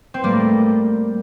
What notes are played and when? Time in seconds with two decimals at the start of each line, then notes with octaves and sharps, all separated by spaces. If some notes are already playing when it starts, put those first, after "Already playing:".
0.14 C4
0.23 A2 G3 A#3